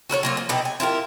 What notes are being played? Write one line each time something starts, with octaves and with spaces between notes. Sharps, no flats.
F#4 A4 A#4 C#5
F#3 A#3 F4
F3
B2 D#4 E4 G4
G#5
E4 F4 G4 A#4